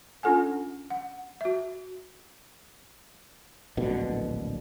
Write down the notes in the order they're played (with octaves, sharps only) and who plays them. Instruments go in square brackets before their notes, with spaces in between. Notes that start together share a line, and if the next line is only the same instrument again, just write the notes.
[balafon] C#4 D4 F4 A4 F#5 G#5
F#5
F#4 E5
[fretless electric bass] D1 A#1 B2 D3